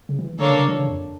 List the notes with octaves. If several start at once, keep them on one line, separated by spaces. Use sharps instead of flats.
C#3
E3
D3 A#3 D4 A4 C#5
C#3
C#3
E3
C#3
F2